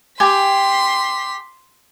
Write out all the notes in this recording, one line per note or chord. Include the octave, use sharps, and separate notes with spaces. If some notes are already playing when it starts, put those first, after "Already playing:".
G4 G5 G#5 C6 B6